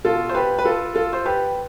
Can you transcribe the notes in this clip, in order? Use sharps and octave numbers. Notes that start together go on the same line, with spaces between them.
B2 F4 A4
C5
G4 B4
B4
F4 A4
F4 A4
C5
G4 B4